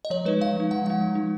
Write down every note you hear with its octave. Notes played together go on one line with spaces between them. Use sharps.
D#5
F3 C#5
G#3 D#4 B4
F3 F5
G#3 D#4
F3 F#5
G#3 D#4 F#5
F3
G#3 D#4